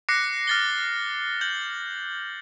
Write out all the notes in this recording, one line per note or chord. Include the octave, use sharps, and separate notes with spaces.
D6 F#6 A#6 C7 C#7
F6 A6 G7
G6 F#7